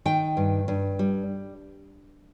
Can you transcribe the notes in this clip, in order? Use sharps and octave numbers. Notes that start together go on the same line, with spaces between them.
D#3 G5
G2
G2
G3